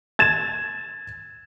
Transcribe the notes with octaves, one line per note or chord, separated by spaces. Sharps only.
G#6 A6 E7